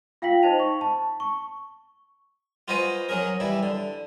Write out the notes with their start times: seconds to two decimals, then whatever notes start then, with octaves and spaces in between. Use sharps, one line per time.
0.22 F4 F5 G5 A#6 B6 F#7
0.43 D#4 C5 D#5 A5 F7
0.59 C#6
0.81 A5
1.20 C#6
2.68 F4 F#4 B4 C5 D#5 G#5
3.09 F#3 C#4 G#4 A#4
3.40 E3 G3 E4
3.63 D3